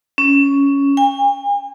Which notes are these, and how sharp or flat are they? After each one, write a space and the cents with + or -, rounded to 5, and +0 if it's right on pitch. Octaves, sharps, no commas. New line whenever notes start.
C#4 +10
G#5 -45